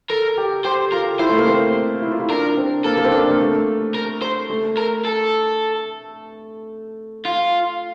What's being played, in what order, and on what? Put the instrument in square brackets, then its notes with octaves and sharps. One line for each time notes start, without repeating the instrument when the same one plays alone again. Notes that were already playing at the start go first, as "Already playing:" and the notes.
[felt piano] A4 [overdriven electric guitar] A#4
[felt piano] G4
[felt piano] G4 [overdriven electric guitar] C5
[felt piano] F4 [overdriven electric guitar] A#4
[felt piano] E4 [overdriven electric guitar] C5
[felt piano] A3
A#3
C4
E4
F4
E4
[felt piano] D4 [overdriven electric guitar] A#4
[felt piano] C4
[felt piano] A#3 [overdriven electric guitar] A4
[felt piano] A#3
C4
D4
A#3
A3
[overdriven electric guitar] A#4
C5
[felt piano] A3
[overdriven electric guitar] A#4
A4
F4